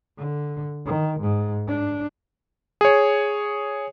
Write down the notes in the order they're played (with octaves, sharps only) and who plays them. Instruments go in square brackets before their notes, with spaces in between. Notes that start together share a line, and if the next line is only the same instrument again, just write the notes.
[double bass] D3
D#3
G#2
D4
[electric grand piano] G#4 C#5